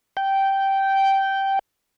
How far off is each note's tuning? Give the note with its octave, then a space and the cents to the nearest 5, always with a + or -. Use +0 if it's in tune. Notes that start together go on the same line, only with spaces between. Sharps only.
G5 -10